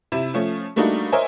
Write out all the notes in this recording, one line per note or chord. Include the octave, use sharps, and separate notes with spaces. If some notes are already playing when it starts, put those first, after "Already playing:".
C3 E4 E7
F3 A3 C#4
G3 A3 A#3 D4 D#4 F#4
A#4 C5 C#5 D#5 E5 G#5